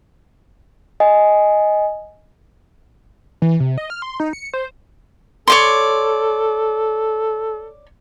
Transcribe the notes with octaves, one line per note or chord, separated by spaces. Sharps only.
D#5 G#5
E3
C3
D#5
F6
C6
D#4
C#7
C5
A4 C#5 D5 C6